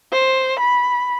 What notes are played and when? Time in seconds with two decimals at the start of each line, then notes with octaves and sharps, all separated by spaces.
0.13 C5
0.59 B5